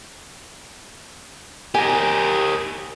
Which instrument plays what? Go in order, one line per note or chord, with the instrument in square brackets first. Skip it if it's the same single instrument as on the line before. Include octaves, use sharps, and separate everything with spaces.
[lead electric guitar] G4 A#4 [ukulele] G#5